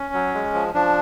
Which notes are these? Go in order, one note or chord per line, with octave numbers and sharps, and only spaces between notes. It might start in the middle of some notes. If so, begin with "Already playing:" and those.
Already playing: C#4
F#3
G#3
F3
F3 D4